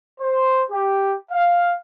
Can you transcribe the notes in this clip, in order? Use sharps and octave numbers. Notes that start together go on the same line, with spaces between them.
C5
G4
F5